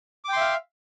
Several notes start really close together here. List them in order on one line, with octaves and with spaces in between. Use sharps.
D6 G5 C6 E5 F5